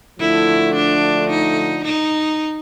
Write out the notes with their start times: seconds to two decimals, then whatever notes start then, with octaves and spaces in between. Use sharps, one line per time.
0.19 D3 F3 A3 E4
0.75 D4
1.30 D#4
1.85 D#4